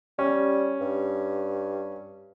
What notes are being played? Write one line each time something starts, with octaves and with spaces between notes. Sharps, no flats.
G3 C#4
G2